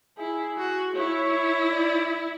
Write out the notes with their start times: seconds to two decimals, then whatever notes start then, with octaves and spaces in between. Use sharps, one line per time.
0.18 E4 G#4
0.57 F#4
0.96 E4 C#5
1.72 D5